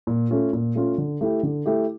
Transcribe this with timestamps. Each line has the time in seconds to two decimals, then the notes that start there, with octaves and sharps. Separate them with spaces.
0.07 A#2
0.31 A3 C#4 F4
0.53 A#2
0.75 A3 C#4 F4
0.98 D3
1.21 A3 E4 G4
1.43 D3
1.66 A3 E4 G4